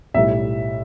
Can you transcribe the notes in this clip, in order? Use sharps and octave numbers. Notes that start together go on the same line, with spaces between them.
B1 A2 G3 E5